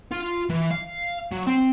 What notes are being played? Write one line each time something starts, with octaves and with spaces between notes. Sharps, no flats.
F4
E3
F5
F#3
C4